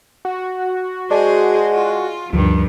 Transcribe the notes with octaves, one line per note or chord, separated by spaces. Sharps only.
F#4
G#3 G#4 C5 D5 A5
F4
D2 G2 D#3 F3